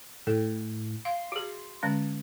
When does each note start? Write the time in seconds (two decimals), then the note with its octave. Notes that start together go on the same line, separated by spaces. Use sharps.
0.27 A2 G5
1.05 F5 C6
1.32 F#4 G#4
1.83 D3 G#3 C#4